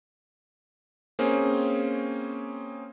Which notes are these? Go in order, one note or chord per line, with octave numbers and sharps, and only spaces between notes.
A#3 C4 C#4 G#4